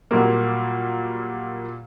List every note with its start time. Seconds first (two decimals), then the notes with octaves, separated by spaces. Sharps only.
0.11 A#2 F#3 G3 A#3